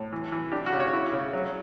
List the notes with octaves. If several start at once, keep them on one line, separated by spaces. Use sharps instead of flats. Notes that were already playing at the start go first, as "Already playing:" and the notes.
Already playing: A2
E3
E3
D4 G4
F#4
C#3
C#5
E4
C#3
F#3